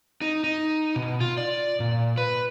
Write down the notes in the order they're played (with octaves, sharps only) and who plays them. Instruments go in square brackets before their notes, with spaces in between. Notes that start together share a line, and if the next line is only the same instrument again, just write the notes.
[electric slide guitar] D#4
D#4
B2
F4
D5
A#2
B4